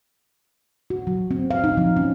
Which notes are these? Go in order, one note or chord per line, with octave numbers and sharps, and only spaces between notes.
F#4
F#3
C4
F5
D#4
F3
C#4